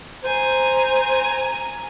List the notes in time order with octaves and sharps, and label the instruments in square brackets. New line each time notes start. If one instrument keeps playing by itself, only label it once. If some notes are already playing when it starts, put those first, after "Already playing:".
[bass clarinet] C5 [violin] G#5 A#5